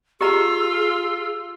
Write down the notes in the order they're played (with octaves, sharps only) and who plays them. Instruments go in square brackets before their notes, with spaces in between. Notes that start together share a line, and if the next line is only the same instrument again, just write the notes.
[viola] F4 [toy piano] G4 D#5 A#5 [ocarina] G#4 [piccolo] E6